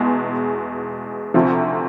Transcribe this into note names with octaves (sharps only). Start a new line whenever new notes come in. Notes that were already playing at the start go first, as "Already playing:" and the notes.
Already playing: E2 B2 G#3
D2 C3 F3